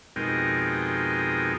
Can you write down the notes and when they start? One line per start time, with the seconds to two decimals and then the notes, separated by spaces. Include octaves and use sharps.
0.16 F2 B2 G#3 D#4 A#4 G5